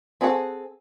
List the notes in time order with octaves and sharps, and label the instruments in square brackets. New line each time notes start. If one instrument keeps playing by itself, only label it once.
[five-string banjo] C4 G#4 A4 C#5 F#5